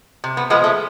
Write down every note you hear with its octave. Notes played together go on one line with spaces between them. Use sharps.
C3
B3
F3 G#3 B3
A3